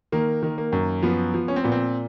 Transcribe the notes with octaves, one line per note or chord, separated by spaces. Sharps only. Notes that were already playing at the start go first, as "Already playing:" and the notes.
D#3 A#3
D#3
A#3
F#2
F3 B3
F3
C#4
C4
A#2 B3
C4